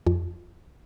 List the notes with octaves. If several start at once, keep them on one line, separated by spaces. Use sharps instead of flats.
F2